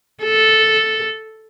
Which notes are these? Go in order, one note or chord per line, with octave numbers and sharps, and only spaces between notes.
A4